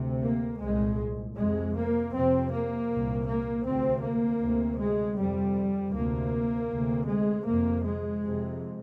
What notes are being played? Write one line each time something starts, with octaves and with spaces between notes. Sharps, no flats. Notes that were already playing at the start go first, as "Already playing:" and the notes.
Already playing: D2 C3
A#3
C2 A#2 G#3
F2 C3 G#3
A#3
F2 C3 C4
A#3
C2 A#2
A#3
D2 C3 C4
A#3
D2 C3
G#3
F2 C3 G3
D2 C3 A#3
D2 C3
G#3
F2 C3 A#3
G#3
F2 C3